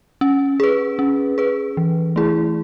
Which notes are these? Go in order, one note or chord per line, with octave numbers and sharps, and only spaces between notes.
C#4
G#4 B4
C#4
G#4 B4
E3
A3 E4 G#4